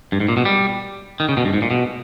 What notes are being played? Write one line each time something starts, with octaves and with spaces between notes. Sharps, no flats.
G2
G#2
A#2
B2
G3
D#3
C#3
B2
G2
G#2
A#2
B2